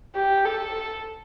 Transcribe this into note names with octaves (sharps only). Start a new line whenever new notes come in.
G4
A4